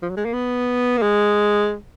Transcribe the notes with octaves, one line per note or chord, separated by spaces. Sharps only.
F3
F#3
G#3
A#3
B3
A#3
G#3